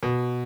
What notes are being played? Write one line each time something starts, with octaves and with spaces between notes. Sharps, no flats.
B2